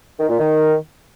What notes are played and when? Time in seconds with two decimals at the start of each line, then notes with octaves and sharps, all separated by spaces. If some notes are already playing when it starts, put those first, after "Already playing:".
0.20 D#3
0.29 A#2
0.39 D#3